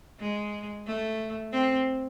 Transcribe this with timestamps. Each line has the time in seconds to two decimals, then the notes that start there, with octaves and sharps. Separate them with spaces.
0.20 G#3
0.86 A3
1.52 C4